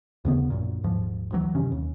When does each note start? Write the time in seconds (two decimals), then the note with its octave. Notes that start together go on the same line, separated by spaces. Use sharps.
0.25 D#2 C#3 B3
0.50 A#1 F#2 A#2
0.84 D#1 G#2 F3
1.32 D2 E3 F#3
1.55 F#2 C3 D#3 C#4
1.72 D#2